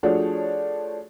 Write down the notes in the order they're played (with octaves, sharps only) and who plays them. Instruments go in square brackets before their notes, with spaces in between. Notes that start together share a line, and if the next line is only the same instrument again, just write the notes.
[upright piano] F3 A3 D4 F#4 G#4 C#5